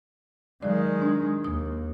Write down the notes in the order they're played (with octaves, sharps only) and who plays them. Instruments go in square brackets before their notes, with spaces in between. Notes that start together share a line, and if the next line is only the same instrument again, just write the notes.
[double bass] D#3 G#3 [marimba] F#3 D5
[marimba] D4
[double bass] D#2 [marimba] D#6